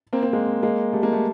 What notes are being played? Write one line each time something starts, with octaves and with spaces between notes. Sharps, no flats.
A#3 C4
A#3 C4
G#3 A#3
G#3 A#3
G3 A3
G#3 A#3
G3 A3